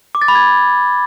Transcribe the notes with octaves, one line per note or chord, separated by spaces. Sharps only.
D6
A6
B5
G#6